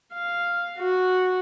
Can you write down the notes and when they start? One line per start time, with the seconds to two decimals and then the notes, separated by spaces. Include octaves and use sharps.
0.13 F5
0.78 F#4